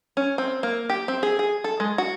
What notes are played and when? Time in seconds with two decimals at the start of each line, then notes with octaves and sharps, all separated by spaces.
0.17 C#4
0.38 C4
0.63 A#3
0.89 G4
1.08 C4
1.23 G#4
1.39 G#4
1.64 A4
1.80 G#3
1.98 F#4